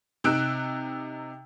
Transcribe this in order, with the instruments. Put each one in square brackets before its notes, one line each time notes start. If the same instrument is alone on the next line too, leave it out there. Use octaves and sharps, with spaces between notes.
[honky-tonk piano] C3 D#4 E6 F#6 D7